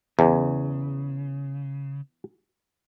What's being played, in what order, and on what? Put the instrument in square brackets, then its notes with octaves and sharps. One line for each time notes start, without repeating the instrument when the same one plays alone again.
[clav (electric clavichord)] E2 [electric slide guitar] C#3